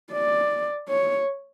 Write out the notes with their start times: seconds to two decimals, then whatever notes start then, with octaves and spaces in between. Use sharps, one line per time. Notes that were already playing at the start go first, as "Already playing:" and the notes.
0.12 D5
0.89 C#5